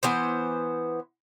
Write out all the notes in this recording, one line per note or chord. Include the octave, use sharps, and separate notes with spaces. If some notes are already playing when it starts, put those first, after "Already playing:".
E3 B3 C5